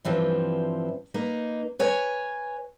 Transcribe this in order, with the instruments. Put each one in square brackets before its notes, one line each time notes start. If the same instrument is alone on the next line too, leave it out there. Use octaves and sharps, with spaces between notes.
[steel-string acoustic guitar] G2 E3 F3 C4
A#3 D#4 B4
B4 C#5 G#5